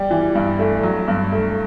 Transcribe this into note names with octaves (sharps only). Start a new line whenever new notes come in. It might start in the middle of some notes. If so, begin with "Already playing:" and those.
Already playing: G3 G4
E3
G2
A3
F#3
G2
A3